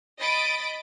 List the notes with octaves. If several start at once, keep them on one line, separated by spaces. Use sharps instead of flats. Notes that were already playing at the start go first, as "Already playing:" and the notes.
D#5 B5 D#6 A6 D7